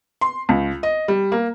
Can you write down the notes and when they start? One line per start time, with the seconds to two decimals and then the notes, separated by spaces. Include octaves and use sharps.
0.21 C6
0.49 C#2
0.83 D#5
1.08 G3
1.32 A#3